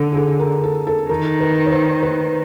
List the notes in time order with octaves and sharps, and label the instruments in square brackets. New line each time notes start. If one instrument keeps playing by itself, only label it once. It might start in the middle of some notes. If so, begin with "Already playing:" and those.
Already playing: [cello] D3 [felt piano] A4
[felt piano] G#4
A4
A#4
A4
A4
[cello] D#3 [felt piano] A#4
[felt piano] B4
C#5
C5
B4